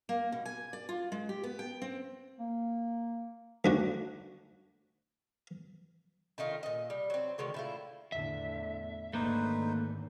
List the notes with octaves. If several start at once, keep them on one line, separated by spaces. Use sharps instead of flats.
A#3
B2
G#5
D5
F4
G#3
G4
B3
G5
C4
A#3
D2 D4 F#4
D#3 A3 D#4 F4
A#2 D#5
G3
F#3 C4
D3 D#3 G#3 F#4
A2 E4 F4
E2 A2 D3 E5
G#1 D3 A3 A#3 D#4 B4 C5